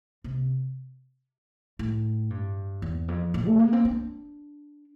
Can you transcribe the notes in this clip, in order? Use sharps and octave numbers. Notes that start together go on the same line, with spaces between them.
C3
A2
G2
E2
F2
A#2
A3
A#3
C4
D4